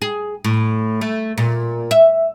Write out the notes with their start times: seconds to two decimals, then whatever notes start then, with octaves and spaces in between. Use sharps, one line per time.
0.02 G#4
0.44 A2
1.01 A3
1.38 A#2
1.91 E5